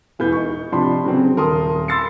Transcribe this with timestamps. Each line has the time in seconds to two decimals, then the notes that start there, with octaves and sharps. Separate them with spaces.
0.19 E1 E3 B3 E4 G6
0.32 D#4 C#6
0.72 C3 F3 D4 A5 B5 C6
1.04 C#3 F#3 C4
1.37 D#1 A#4 A5 C6 D#6
1.88 B5 C6 E6 A6 C7 C#7